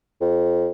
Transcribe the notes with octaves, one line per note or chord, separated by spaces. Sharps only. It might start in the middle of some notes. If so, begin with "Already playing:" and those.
F2